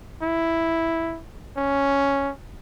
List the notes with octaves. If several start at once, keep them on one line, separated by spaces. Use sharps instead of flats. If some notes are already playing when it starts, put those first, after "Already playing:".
E4
C#4